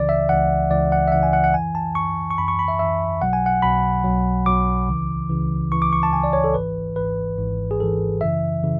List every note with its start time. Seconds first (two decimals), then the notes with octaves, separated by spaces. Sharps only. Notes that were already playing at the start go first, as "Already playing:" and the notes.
Already playing: C#2 C#3 E3 D5
0.09 E5
0.29 C#2 C#3 E3 F#5
0.70 C#2 C#3 E3 D5
0.92 F#5
1.08 E5
1.12 C#2 C#3 E3 F#5
1.23 G#5
1.33 F#5
1.44 F#5
1.54 F#2 E3 G#5
1.75 A5
1.95 F#2 E3 C#6
2.31 C#6
2.38 F#2 E3 B5
2.48 C#6
2.59 B5
2.68 E5
2.79 F#2 E3 E5
3.21 B1 B2 F#3 F#5
3.33 G#5
3.46 F#5
3.62 B1 B2 F#3 B5
4.04 B1 B2 F#3
4.46 B1 B2 F#3 D6
4.88 C#2 C#3 E3
5.30 C#2 C#3 E3
5.72 C#2 C#3 E3 C#6
5.82 D6
5.93 C#6
6.03 A5
6.13 C#2 C#3 E3 G#5
6.24 D5
6.33 C#5
6.44 A4
6.54 G#1 G#2 E3 B4
6.96 G#1 G#2 E3 B4
7.38 G#1 G#2 E3
7.71 G#4
7.80 G#1 G#2 E3 A4
8.21 F#2 C#3 E3 E5
8.64 C#3 E3